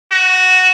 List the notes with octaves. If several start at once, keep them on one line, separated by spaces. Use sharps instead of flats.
F#4